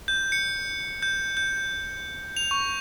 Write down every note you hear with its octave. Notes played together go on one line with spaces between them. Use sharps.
G6
C#7
G6
G6
F7
C#6